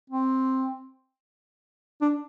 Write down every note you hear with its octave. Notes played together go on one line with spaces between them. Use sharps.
C4
D4